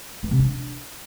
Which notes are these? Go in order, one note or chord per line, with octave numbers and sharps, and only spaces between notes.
E3
C3
D4